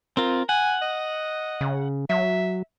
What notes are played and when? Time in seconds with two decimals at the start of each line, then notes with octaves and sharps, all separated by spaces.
0.17 C4 F4 A#4
0.49 F#5 G#5
0.82 D#5
1.61 C#3
2.10 F#3 E5